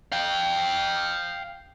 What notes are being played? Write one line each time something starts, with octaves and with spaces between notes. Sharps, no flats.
F5 G5